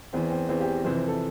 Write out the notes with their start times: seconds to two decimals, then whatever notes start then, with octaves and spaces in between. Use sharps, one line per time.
0.13 E2 E3 C4
0.31 C4
0.49 E2 E3 C4
0.61 G4
0.85 F2 C3 E3 C5
0.96 C5
1.08 A4